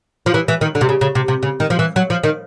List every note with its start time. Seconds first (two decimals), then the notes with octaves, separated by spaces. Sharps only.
0.26 F3
0.34 E3
0.48 E3
0.61 D#3
0.75 D3
0.81 C3
0.89 C#3
1.01 C#3
1.15 C3
1.28 C3
1.43 C#3
1.60 D#3
1.70 F3
1.79 E3
1.96 F#3
2.10 F3
2.24 D#3